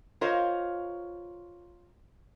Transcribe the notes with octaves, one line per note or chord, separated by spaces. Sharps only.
F4 A#4 C5 C#5 D#5 F5